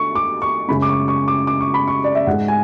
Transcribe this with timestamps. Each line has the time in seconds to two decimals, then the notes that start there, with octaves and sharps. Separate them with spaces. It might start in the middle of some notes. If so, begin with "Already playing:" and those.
Already playing: D3 A3 C#6
0.15 D6
0.42 C#6
0.68 F#2 C#3 G#3 B5
0.82 D6
0.89 C#6
1.08 C#6
1.28 D6
1.47 D6
1.61 C#6
1.74 B5
1.88 C#6
2.04 D5
2.15 E5
2.27 G#2 G#3 F#5
2.48 G#5